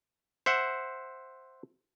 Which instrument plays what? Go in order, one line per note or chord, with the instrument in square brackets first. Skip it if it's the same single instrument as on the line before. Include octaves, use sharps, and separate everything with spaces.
[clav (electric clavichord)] C5 E5 F#5